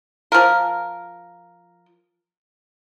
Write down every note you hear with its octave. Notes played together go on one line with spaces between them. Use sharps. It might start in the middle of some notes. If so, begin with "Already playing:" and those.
F3 A#4